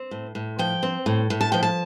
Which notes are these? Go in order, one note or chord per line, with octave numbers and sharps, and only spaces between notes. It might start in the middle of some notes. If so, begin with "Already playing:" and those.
Already playing: C4
A2
A2
F3 G5
C4
A2
A2
A5
F3 G5
A5